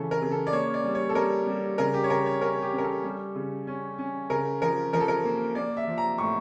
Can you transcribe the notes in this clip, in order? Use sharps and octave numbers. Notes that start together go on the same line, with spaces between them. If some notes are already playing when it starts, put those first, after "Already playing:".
Already playing: C#3 E3 C#4 A4
A#4
C#3
A4
D5
A#3 C#5
D5
G3
C#5
A4
G3 A#4
G3
C#3 A#4
G4
C#5
C#3 A#4
C#5
C#4 A#4
G4
C#4
A#4
A4
G3
C#3
C#4
C#4
C#3 A#4
F3 A#4
F3 A#4
A4
A#4
A#3
A#3 D5
E5
F3
A#5
A2 C#6